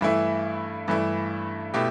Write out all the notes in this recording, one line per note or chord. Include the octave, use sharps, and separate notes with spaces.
G2 E3 A3 E4
G2 E3 A3 E4
B2 A3 E4 G4